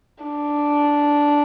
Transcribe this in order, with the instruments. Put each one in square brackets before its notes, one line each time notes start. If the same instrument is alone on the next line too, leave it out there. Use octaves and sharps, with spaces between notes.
[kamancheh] D4